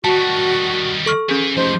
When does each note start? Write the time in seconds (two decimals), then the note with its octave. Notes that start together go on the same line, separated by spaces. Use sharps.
0.04 D#3 G3 F#4 A5
1.06 A4 C#6 F6
1.29 C#4 G#4 B4 G#5
1.57 F3 A3 D#4 G4 C5